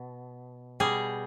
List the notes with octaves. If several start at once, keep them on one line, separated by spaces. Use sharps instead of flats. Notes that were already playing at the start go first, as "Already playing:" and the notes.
Already playing: B2
B2 G3 G#4